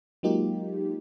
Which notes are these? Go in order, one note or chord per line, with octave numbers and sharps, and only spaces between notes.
F#3 G#3 A#3 D#4 F4 G4